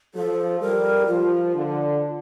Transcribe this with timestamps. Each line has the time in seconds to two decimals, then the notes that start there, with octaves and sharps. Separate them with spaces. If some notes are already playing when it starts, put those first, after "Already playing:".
0.14 F3 A4
0.60 G3 A#4
1.07 F3 F4
1.54 D3